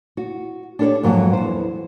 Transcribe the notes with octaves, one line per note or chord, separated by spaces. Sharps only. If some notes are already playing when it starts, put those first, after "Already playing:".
F#4
D4 G4 A4 A#4 C#5 D5
F2 G#2 F#3 A#3 F#4 A4
E2 C5